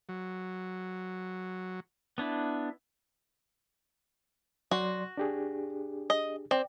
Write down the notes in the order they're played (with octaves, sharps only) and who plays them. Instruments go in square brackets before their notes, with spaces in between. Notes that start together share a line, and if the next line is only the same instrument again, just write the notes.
[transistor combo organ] F#3
[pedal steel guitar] B3 D4 E4
[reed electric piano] F#3 D5 C6 [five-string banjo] F#4
[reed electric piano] D4 G4 G#4
[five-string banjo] D#5
[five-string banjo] C4 [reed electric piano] D5